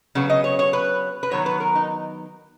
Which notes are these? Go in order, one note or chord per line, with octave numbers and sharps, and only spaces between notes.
C#3 F#3 B3 F#4
D#5
C#5
C#5
B4
B4
D#3 F#3 B3 C#5
B4
A#4
D#4